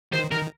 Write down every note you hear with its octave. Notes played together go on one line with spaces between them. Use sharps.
D#3 C5
D#3 A#4